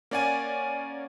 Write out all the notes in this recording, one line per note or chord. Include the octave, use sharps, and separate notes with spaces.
A#3 C#4 D5 F#5 G#5